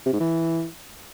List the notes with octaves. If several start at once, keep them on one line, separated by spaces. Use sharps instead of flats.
C3
G#2
E3